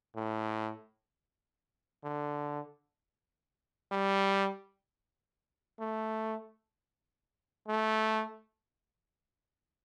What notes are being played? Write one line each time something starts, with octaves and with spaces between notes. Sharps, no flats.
A2
D3
G3
A3
A3